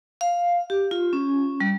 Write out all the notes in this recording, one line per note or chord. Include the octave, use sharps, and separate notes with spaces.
F5
G4
F4
C#4
G3